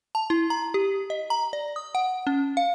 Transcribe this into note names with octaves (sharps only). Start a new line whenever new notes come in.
A5
E4
A#5
G4
D#5
A#5
D5
D#6
F#5
C#4
F5